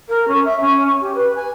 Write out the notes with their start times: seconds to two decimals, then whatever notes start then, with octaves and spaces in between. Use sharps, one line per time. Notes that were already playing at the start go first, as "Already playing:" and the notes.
0.09 A#4
0.28 C#4
0.45 E5
0.61 C#4
1.01 G4
1.15 B4
1.35 G#5